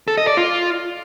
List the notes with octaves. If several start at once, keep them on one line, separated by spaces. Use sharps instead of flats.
A4
D#5
D5
F4